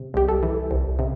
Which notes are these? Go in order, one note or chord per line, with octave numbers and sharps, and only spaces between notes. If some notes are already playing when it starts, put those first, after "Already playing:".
Already playing: C3
C2 G4
A4
E3
C2
C3